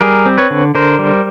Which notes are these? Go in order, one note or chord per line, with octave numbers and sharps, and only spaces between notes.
G3 G#4 A#4
C4
B4 C#5
D3
D3 A#4 C5
G3